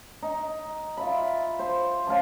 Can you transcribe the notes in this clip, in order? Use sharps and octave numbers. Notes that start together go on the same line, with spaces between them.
D#4
F4 E5 B5
C5
F3 C#4 F5 A5